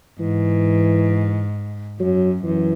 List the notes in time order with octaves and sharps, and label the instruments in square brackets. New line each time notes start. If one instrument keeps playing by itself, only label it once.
[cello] G#2 [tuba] E3
[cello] F#2 [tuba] F#3
[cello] F#2 [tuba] E3